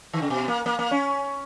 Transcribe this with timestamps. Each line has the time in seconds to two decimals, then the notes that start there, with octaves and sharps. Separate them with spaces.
0.13 D#3
0.22 C#3
0.30 B2
0.48 A#3
0.66 A#3
0.79 A#3
0.91 C#4